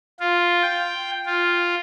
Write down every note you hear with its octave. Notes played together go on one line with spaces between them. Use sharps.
F4
G5
F4